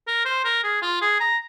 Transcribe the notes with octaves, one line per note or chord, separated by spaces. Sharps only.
A#4
C5
A#4
G#4
F4
G#4
A#5